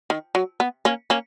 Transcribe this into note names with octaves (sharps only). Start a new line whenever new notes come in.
D#3
F#3
B3
A#3 C#4
A#3 C#4